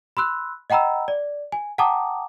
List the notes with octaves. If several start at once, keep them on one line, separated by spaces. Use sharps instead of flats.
B5 C6 E6 F#6
D#5 F#5 G5 A#5 B5 E6
D5
G#5
F#5 G5 A5 A#5 D6 D#6